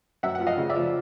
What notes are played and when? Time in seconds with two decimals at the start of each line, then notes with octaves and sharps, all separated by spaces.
0.23 F#2 E5 F#5
0.35 F#5
0.40 F3
0.47 D#5 F5
0.58 C#3
0.69 D5 E5
0.76 F3